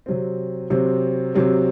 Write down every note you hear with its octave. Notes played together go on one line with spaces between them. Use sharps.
C3 F#3 C4
C3 F#3 C4
C3 F#3 C4